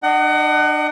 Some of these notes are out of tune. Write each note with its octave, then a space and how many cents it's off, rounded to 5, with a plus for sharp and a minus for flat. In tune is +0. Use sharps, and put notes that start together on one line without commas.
D4 +40 D#5 -5 F#5 +30